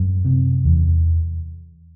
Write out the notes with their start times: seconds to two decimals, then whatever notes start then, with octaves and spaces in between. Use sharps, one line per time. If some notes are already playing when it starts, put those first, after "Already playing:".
Already playing: F#2
0.25 C3
0.65 E2